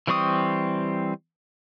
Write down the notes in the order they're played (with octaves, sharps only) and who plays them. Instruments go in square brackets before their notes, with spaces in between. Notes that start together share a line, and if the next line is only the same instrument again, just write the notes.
[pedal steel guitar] E3 G3 C4 C#6 D#6